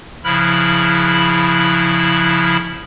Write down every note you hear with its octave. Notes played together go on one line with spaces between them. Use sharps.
C#3 F3 E4 B5 F6 F#6